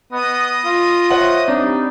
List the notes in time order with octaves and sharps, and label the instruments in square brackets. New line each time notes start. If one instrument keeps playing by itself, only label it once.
[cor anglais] B3 [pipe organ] D#5 D#6
[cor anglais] F4
[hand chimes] C5 C#5 E5 [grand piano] F#5
[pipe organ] G3 [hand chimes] C4 [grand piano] D4 [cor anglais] D#4